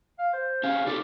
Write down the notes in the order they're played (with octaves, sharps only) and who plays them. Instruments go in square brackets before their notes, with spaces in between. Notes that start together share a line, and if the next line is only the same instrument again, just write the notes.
[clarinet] F5
C5
[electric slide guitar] C3 C#4 [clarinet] F5
[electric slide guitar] D#4 G4 A4 [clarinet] D5